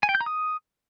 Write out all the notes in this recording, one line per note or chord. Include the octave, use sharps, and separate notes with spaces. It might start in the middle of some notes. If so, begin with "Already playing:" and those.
G#5
G5
G6
A#5
D#6